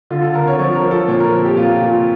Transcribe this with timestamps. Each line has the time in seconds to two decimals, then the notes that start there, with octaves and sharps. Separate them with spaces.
0.10 D3 F4
0.22 A4
0.34 D3 A#4
0.48 C#5
0.59 F3 C#5
0.76 A#4
0.83 F3
0.91 A4
1.08 A#2 C#5
1.20 A#4
1.32 F3 A4
1.45 G4
1.57 A#2 F4
1.81 A#2